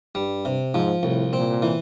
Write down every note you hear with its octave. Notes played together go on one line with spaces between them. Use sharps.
G2 G3
C3
G#2 F3
C2 A2
A#2 C4
E3